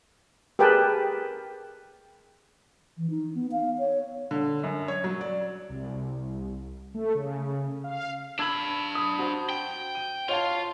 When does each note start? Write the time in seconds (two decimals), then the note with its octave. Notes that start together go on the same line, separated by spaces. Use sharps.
0.59 G4 G#4 A#4 B4 G5 A5
2.97 E3
3.10 D#4
3.35 B3
3.52 F5
3.79 C#5
4.31 D3
4.63 F#2
4.88 C#5
5.04 F#3
5.21 D5
5.69 C2
6.94 A3
7.15 C#3
7.84 F5
8.39 D4 B5 E6 G#6
8.95 D#6
9.18 F#4 C5 A5
9.49 G5
9.95 D#7
10.29 F4 C#5 F5 A5